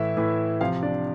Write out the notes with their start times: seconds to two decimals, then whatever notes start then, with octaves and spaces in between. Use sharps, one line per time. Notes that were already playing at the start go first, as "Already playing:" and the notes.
Already playing: A2 E3 E4 E5
0.17 A2 E3
0.60 C3 F3 F4 F5
0.83 D4 D5